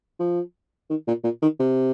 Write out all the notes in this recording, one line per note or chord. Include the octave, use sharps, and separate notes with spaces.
F3
D#3
A#2
A#2
D#3
C3